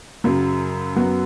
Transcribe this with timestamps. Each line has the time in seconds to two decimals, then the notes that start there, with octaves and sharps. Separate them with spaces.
0.24 F#2 C#3 F#3
0.96 F#2 F#3 B3 F#4